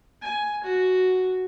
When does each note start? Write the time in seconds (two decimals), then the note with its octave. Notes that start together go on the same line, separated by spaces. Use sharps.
0.22 G#5
0.64 F#4